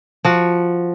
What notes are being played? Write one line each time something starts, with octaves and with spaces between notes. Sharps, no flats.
F3 F#4